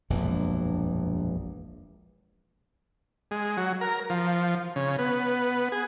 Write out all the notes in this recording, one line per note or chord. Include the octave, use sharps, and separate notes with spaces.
E1 A#1 F#2 E3
G#3
F#3
A#4
F3
C#3
B3
G#4